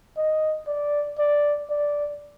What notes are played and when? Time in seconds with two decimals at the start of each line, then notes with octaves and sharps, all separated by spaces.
0.17 D#5
0.67 D5
1.18 D5
1.70 D5